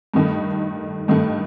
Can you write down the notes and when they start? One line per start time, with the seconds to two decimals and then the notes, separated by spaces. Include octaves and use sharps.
0.14 G2 D#3 A3
1.08 G2 D#3 A3